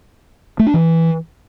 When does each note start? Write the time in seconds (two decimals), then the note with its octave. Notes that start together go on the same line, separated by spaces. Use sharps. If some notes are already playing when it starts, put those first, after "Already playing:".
0.59 A3
0.67 D4
0.74 E3